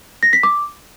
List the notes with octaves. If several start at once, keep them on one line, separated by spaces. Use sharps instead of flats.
A#6
B6
D6